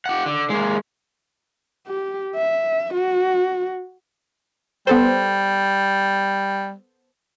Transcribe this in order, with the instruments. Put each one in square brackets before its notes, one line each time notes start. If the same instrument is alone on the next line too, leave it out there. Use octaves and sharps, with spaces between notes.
[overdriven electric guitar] G4 F#5
D3
G#3 A#3
[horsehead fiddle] G4
E5
F#4
[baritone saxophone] G3 [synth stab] B3 A4 C5